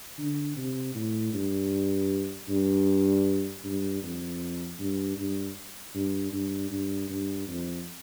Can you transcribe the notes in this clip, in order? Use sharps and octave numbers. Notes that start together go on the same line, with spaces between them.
D3
C3
A2
G2
G2
G2
F2
G2
G2
G2
G2
G2
G2
F2